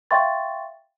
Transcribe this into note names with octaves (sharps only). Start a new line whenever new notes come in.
E5 F5 G5 C6 C#6 A6